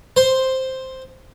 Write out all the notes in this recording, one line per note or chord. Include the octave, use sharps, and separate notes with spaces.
C5